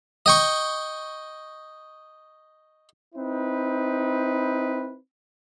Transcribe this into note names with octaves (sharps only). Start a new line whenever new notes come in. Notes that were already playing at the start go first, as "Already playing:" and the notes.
D#5 G5 C#6
C4 D#4 E4 B4